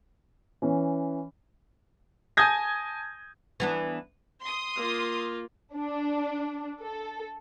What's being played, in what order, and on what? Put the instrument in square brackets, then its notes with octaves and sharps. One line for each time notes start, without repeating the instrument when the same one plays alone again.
[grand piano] E3 C#4
G#5 A5 D#6 G6 G#6 A#6
[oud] E3 B3 D4
[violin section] C6 D#6
[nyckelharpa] A#3 F4
[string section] D4
A4